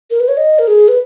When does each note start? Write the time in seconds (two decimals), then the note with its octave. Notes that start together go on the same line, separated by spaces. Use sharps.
0.11 A#4
0.20 B4
0.28 C#5
0.37 D#5
0.59 A#4
0.68 G#4
0.88 B4